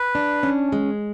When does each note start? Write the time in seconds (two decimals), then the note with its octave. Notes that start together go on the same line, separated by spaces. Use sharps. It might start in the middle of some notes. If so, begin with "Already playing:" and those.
Already playing: B4
0.15 D4
0.43 C#4
0.72 G#3